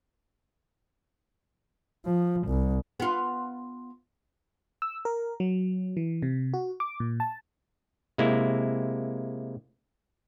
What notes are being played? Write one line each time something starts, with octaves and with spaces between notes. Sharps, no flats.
F3
C2
B3 F4
E6
A#4
F#3
E3
C3
F#4
D6
A#2
A5
C3 G#3 A#3 E4